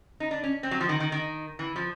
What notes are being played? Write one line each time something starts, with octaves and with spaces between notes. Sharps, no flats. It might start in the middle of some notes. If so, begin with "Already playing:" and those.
D#4
D4
C#4
C4
F#3
F3
D#3
D#3
D#3
E3
F3